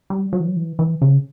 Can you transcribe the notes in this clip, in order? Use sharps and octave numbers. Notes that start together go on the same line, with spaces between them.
G3
F#3
E3
F#3
E3
E3
C#3